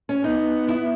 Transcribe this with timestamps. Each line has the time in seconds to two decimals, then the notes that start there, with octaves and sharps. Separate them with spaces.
0.09 C#4
0.23 B3 D#4
0.68 E4